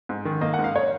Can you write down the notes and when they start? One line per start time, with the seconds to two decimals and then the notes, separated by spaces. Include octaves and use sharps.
0.09 G#2
0.25 D#3
0.41 A#3 D#5
0.54 F#5
0.59 G#2
0.64 F5
0.76 C#5